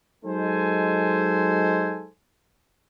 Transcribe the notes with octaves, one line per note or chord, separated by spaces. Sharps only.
F#3 G#3 D#4 A4 C5 G#5